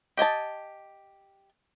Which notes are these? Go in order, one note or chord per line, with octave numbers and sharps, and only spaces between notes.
G4 D#5 G#5 A5